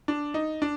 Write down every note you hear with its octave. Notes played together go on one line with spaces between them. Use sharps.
D4
D#4
D4